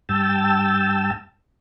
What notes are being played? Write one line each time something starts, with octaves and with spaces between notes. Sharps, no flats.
G2 G5 A5 E6